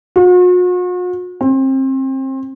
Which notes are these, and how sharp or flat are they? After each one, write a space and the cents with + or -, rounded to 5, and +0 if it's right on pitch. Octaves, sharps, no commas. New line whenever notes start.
F#4 -45
C4 +30